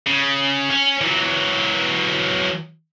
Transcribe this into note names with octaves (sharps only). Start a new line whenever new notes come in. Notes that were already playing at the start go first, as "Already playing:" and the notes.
C#3
C#4
E3 F#3